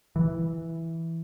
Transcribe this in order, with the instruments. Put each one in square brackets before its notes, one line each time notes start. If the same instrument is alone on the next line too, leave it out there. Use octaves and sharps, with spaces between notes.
[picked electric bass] E3